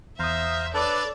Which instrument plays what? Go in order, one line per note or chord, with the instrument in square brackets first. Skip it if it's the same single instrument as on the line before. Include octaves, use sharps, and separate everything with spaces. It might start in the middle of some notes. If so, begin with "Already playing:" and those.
[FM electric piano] E2 D#6 [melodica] C5 F5 A#5 [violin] E5
[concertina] D4 A4 B4 [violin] C#5 D5 [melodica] A5